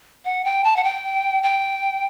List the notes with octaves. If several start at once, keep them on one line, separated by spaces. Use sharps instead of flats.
F#5
G5
A5
F#5
G5
G5